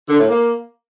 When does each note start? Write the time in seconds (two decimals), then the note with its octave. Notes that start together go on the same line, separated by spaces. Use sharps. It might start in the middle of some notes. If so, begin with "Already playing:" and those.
0.09 D3
0.19 A2
0.29 A#3